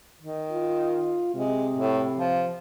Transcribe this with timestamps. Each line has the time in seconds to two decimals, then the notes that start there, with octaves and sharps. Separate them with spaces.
0.21 D#3
0.52 F4
1.35 C3 G#3
1.77 A2
2.18 F3